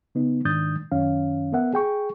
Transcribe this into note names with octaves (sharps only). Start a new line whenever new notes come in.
C#3 B3 D#4
G#2 D#3 D4 D#6 G6 A6
F#2 D#3 C#4 F5
B3 A#4 E5 F#5
G#4 G5 C#6